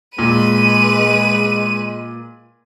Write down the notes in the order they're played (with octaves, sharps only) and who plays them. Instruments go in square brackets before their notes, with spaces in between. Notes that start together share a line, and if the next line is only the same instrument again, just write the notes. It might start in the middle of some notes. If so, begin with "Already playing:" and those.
[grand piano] A#2 [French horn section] G#3 [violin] B4 D#7